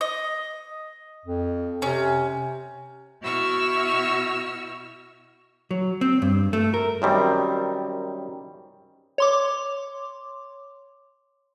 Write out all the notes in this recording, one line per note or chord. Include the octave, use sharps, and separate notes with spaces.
D#5
F2
C3 C#4
B2 E4 F#4 C#6 E6 F6
F#3
C4
G2
A3
A#4
F#2 D#3 G3 C4
C#5 C6 D6